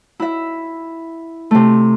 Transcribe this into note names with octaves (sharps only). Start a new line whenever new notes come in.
E4 E5
C3 A3